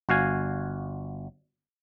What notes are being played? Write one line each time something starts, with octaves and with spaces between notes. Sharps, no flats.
G1 F#4 F5 G#5